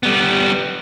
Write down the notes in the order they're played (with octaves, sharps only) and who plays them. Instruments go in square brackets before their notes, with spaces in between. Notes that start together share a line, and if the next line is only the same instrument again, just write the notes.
[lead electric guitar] G3 B3